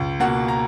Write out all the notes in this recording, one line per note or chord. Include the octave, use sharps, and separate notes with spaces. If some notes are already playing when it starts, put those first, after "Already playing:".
Already playing: C#2
B2 A#3 F#5
A#5